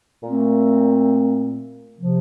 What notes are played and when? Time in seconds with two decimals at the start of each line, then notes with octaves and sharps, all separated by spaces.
0.23 A#2 A3 C4
1.98 C3 F3